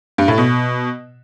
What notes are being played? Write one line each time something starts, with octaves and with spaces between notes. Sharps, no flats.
G2
A2
B2